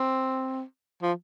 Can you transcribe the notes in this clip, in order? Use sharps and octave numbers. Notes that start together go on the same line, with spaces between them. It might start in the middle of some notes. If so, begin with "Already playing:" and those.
Already playing: C4
F3